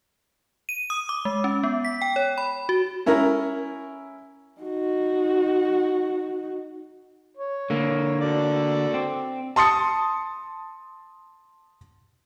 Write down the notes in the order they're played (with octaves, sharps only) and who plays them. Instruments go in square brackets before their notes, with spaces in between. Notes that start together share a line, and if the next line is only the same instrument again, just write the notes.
[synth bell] D#7
D#6
D6
G#3
C#4
B3
B6
G5
C#5
B5
F#4
[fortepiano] C#4 E4 A#4 A#5
[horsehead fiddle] D#4 F#4
[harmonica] C#5
[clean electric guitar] D3 A#3
[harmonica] F#4 A4 D5
[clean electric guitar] C4
[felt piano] A5 C6 D#6 A6 C#7